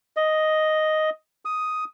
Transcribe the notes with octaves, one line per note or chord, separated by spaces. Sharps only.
D#5
D#6